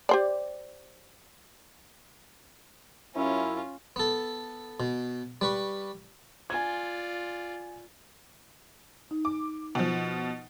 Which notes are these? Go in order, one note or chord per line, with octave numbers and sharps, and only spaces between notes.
G4 C5 D5
F#2 C#4 E4 F4
B3 A4
B2
G3 B4 C#6
F4 D5 G#5 G#6
D#4
D6
B2 F3